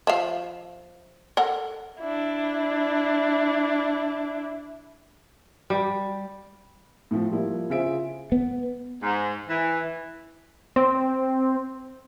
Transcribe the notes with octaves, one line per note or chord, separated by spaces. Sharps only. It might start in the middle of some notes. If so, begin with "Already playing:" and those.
F3 E5 F5
A4 A#4 F#5
D4 E4
G3
A2 F3
F3 G3 A#3 E4
C#3 F4 G#4 C5 E5 D7
B3
G#2
E3
C4